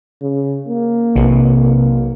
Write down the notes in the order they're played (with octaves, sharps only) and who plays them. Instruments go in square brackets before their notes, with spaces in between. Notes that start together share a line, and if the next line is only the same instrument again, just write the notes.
[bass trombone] C#3
A#3
[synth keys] B1 [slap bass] C3